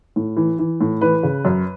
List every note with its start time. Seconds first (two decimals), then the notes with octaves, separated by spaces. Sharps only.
0.16 A2
0.37 E3
0.59 E3
0.81 A2
1.01 E3 B4
1.23 C#3
1.45 F#2